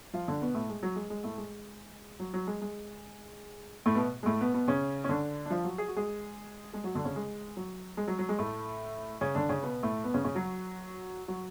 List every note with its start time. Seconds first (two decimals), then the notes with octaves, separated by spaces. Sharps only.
0.13 F3 F4
0.28 D3 D4
0.41 B2 B3
0.54 A2 A3
0.69 G#3
0.83 F#3
0.96 G#3
1.10 G#3
1.24 A2 A3
1.38 G#3
2.20 F#3
2.34 F#3
2.47 G#3
2.61 G#3
3.86 A2 A3
3.95 B2 B3
4.23 G#3
4.26 A2 A3
4.41 B2 B3
4.54 B2 B3
4.68 C#3 C#4
5.04 C#4
5.09 D3 D4
5.46 D4
5.50 F3 F4
5.64 F#3 F#4
5.78 G#4
5.88 F#4
5.96 G#3 G#4
6.74 G#3 G#4
6.84 F#3 F#4
6.95 D3 D4
7.05 C#3 C#4
7.16 G#3
7.57 F#3
7.97 G#3
8.08 F#3
8.19 F#3
8.29 G#3
8.39 A2 A3
9.21 C#3 C#4
9.35 D3 D4
9.49 C#3 C#4
9.63 B2 B3
9.83 A2 A3
10.04 B2 B3
10.14 C#3 C#4
10.24 C#3 C#4
10.35 F#3 F#4
11.28 F#3 F#4